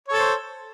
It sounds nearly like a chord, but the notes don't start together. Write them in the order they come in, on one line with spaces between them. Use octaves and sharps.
C#5 A4 C5